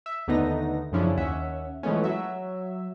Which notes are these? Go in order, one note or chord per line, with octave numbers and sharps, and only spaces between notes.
E5
D#2 D3 A3 B3 D#4 A#6
F#2 C#3 F3 C#4 D4 E4
D#2 C#4 E5 F#5
E3 F3 G#3 A3 B3 C#4
F#3 E5